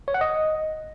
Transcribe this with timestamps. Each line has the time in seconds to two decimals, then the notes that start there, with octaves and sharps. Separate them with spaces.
0.08 C#5
0.14 F#5
0.21 D#5